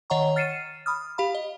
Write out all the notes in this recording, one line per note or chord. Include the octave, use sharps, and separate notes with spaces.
D#3 C#5 D#5 F#5 A#5 C#6
F6 A6 C7 C#7 D#7 E7
B5 D#6 F6
G4 F5 B5
D#5